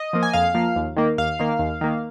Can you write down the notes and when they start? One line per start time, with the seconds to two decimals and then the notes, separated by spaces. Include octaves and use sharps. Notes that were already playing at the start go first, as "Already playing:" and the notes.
Already playing: D#5
0.13 F3 A#3
0.23 G#5
0.33 F2 F5
0.55 F3 A#3
0.76 D#2
0.96 D#3 A#3
1.18 D#2 F5
1.39 D#3 A#3
1.59 D#2
1.81 D#3 A#3